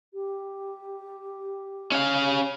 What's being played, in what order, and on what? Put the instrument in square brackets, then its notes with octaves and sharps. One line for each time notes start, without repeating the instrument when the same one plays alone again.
[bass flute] G4
[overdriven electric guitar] C#4 F5